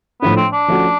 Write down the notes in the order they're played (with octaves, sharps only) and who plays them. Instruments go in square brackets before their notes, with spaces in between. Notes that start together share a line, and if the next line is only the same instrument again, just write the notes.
[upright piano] A2 F3 A3 D4 [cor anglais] B3
[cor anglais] C4
D4
[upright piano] F3 A3 C#4 F#4